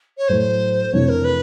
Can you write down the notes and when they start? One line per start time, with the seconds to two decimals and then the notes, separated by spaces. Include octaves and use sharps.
0.18 C#5
0.28 A2 F#3 A3 C5
0.92 F2 C3 E3 A3 D4 C#5
1.09 A#4
1.24 B4